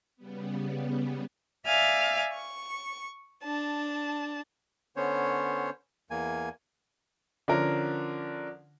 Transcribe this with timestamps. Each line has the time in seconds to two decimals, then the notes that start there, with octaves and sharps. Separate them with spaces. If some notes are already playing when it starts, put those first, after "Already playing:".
0.17 C#3 G3 B3
1.66 D5 E5 F5 G#5 F6
2.33 C#6
3.43 D4 A5
4.96 D3 B3 C#4 C5 C#5
6.10 E2 A#3 G#5
7.48 D3 F3 C#4 A#4